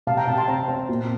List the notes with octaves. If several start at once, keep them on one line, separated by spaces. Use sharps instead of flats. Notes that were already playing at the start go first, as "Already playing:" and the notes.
C3 F5 A5
G5 A#5
C3 F5 A5
A5 C6
C4 G5 A#5
C4
A#2